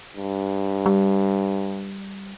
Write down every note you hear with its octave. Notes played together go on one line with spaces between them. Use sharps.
G2
G3